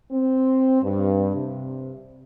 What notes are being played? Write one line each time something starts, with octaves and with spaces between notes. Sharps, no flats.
C4
G2
C3